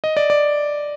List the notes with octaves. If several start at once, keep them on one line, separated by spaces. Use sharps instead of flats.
D#5
D5
D5